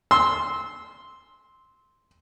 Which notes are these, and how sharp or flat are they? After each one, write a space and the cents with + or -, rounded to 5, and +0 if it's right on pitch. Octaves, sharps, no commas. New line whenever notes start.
C6 +0 E6 -25